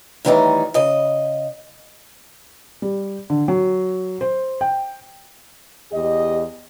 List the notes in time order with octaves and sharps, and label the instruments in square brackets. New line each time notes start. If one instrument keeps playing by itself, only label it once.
[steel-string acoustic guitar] A2 D#3 E3 G3 D4 D#4
C#3 D#5
[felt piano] G3
D3
F#3
C5
G5
[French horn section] E2 G4 D#5